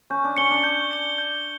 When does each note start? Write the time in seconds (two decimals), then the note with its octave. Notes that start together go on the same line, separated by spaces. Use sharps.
0.10 C#4 G6
0.24 D4
0.37 C#4 C#7 G7
0.50 D4
0.64 G6
0.91 C#7 G7
1.18 G6